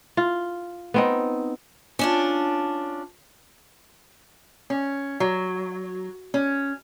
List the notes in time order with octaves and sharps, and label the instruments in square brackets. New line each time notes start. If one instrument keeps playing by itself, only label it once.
[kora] F4
B3 C4 D#4
[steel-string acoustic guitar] C#4 D4 F4
[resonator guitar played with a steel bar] C#4
F#3
C#4